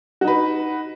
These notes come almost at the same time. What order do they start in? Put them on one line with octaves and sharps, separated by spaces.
F#4 D#4 B4